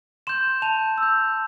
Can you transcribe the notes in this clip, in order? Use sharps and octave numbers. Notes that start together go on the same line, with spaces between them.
C6 G6 E7
A5 F7
E6 G6